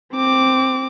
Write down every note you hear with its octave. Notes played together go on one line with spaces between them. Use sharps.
C4 D6